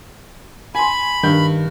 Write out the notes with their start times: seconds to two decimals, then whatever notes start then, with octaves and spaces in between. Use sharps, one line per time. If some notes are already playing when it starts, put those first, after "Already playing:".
0.75 G#5 B5 C6
1.23 G2 D#3 G6